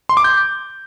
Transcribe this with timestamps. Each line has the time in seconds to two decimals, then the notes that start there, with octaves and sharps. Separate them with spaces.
0.09 C6
0.17 D6
0.24 G6